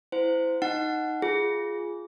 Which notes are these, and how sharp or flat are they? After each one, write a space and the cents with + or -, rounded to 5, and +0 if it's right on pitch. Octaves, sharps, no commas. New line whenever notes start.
E4 +0 C5 -25 F#5 -35
D#4 +0 F#5 +0
F4 +0 G#4 +0